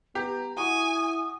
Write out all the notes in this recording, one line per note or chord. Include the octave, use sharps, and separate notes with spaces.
B3 G4 A#5
E4 F#4 G#5 C#6 D#6